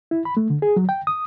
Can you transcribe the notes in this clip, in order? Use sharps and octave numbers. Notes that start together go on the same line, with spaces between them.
E4
B5
A3
D3
G#4
F#3
G5
D#6